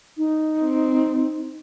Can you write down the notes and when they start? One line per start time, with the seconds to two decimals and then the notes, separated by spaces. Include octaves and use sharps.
0.17 D#4
0.60 C4